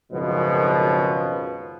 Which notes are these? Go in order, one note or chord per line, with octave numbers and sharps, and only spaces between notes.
G#1 C#2 F#2 B2 F3